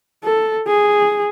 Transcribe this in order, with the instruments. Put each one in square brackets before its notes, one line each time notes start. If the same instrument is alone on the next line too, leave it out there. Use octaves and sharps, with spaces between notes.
[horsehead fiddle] A4
G#4